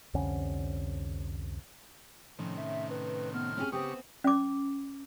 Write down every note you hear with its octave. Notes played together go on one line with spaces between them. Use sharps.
C2 F2 D3 C#4
A2 C3 D#3 F3 C#4
E5
B4
B3 F6
C4 C#4 G4 G#4
C#3 B3 C4 G4 C#6 D#6
C#4 D6